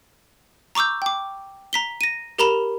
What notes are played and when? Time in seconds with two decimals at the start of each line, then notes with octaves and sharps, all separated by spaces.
0.75 A#5 C#6 D6 E6 G6
1.02 G5 D6
1.73 A#5 B6 G7
2.01 A#6 D#7
2.38 G4 A#4 A#5 B5 E7 F7